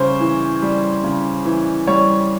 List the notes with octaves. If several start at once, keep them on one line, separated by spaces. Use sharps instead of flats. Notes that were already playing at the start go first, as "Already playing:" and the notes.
Already playing: C#3 G3 C5 C#5
E3
G3
C#3
E3
G3 C#5